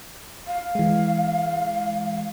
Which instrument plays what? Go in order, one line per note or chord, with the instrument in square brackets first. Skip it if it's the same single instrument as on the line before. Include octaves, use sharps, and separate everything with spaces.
[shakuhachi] F5
[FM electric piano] E3 G#3